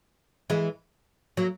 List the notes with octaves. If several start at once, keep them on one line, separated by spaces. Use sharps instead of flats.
E3 G#3
F#3 A#3